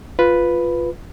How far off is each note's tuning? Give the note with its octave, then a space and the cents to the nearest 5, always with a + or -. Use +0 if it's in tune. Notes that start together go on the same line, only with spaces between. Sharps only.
F4 +0 B4 +0